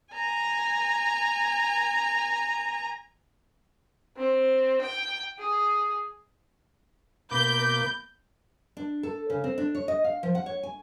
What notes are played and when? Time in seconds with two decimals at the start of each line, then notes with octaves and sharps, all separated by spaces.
0.13 G#5 A#5
4.17 C4
4.81 G5
5.39 G#4
7.31 B2 A#3 B5 D6 G6
8.77 D4
9.03 A4
9.30 C#3
9.44 C4
9.58 D4
9.75 C#5
9.88 D#5
10.04 F5
10.23 F3
10.35 F#5
10.46 C#5
10.63 G#5